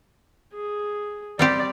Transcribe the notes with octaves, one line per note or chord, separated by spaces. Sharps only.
G#4
G3 C4 G4 D5